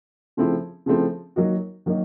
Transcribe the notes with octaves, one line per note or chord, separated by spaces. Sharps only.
C#3 F3 A3 C4 E4
C#3 F3 A3 C4 E4
D#3 F#3 A#3 D#4 F#4
D#3 F#3 A#3 D#4